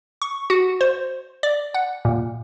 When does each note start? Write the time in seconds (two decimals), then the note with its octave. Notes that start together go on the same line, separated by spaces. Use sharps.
0.22 C#6
0.50 F#4
0.81 C5
1.43 D5
1.74 F#5
2.05 A#2